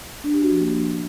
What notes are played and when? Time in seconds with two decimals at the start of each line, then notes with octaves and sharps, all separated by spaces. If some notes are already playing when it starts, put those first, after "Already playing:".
0.24 D4
0.33 G4
0.42 F#4
0.51 F3
0.60 A#3